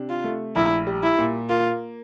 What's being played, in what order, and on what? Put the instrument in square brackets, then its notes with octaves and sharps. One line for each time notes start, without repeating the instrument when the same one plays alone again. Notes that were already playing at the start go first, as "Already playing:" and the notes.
Already playing: [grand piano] C3 D4
[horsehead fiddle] F4
[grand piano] A3
[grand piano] A#1 [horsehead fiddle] E4
[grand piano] G3
[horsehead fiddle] E4
[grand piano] A#2
[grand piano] A#3 [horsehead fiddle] F4